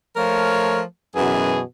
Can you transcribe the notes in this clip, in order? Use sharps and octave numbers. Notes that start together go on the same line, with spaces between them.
F3 A3 A#4 C#5
F#2 B2 E3 G#4